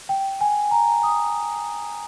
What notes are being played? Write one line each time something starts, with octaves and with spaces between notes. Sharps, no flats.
G5
G#5
A#5
D#6